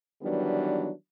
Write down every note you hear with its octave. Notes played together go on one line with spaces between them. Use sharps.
D#3 E3 F#3 G3 B3 D4